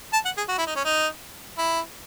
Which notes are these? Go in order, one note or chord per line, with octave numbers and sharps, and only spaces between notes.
A5
F#5
G#4
F#4
E4
D#4
C#4
D#4
E4